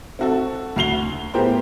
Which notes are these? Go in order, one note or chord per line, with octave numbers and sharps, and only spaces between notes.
C4 F#4 A4
D2 F#4 C7 F7 G7
A2 B3 G4 G#4 A#4 C5